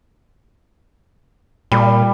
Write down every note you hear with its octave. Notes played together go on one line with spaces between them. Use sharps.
A#2 G3